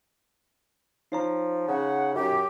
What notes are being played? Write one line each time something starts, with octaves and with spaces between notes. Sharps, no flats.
F3 D#4 C#5 A#5
C#3 F#5
F#2 G4